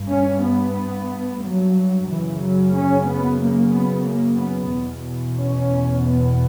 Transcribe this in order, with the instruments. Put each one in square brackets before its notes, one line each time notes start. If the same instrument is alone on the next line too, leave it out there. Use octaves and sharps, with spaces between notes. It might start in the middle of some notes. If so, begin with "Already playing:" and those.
Already playing: [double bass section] G2
C#4
B3
F#3
F#2 C#3 E3
F#3
C#4
B3
A#3
B3
A#3
B3
E2 B2
C#4
B3